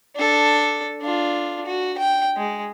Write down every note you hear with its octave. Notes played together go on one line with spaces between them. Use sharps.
D4 A4
D4 F4
F#4
G5
G#3